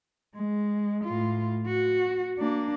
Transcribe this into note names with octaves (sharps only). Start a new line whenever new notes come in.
G#3
A2 F4
F#4
A#3 D4